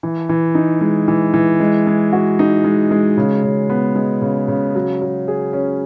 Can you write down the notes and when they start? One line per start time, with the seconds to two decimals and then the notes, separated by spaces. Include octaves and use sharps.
0.03 E3
0.29 E3
0.55 D#4
0.81 G#3
1.08 E3
1.34 E3
1.60 G#3
1.87 G#3
2.13 F#4
2.39 D#4
2.64 G#3
2.91 G#3
3.18 C#3
3.44 C#3
3.70 B3
3.96 G#3
4.22 C#3
4.48 C#3
4.75 F#3
5.02 F#3
5.28 G#4
5.53 C#4